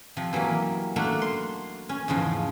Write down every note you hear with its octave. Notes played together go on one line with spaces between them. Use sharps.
C3 F3
E3 F#3 G3 A#3
A3 A#3 D4 F#4
C6
C#4
E2 G#2 C#3 F3